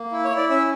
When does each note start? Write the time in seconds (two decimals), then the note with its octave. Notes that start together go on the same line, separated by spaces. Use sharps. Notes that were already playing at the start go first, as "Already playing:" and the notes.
Already playing: A#3
0.12 E4
0.25 C#5
0.31 E4
0.37 D5
0.49 C#4 E5